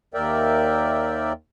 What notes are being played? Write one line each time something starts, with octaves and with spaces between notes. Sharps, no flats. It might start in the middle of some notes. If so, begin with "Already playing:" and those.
D#2 A#4 D5 E5 G5